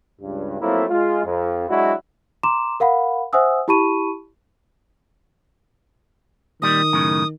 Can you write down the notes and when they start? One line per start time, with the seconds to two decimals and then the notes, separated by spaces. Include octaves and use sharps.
0.21 C#2 G2
0.60 F3 F#3 A3 A#3 C4 E4
0.89 G#3 F4
1.24 F2
1.68 F#3 G#3 D4 E4 F#4
2.43 A#5 C6 D6 E7
2.80 A#4 F5 F#5 B5
3.33 C5 E5 F#5 G#5 D#6 E6
3.68 E4 G4 A5 B5 C#6 D#7
6.62 A#2 D#3 G3 D#6
6.93 F#2 A2 C#3